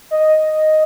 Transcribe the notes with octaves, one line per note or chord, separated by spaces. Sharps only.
D#5